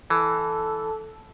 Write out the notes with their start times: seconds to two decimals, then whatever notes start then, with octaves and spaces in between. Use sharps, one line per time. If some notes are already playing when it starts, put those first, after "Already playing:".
0.10 E3 A4